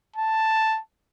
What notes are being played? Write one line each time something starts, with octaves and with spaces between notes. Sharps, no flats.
A5